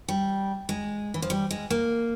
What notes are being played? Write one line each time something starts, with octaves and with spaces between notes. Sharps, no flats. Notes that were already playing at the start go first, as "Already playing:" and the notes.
G3
G#3
E3
F3
G3
G#3
A#3